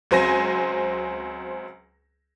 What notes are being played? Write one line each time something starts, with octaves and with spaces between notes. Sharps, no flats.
C#2 F#3 C4 C5 G#5 A#6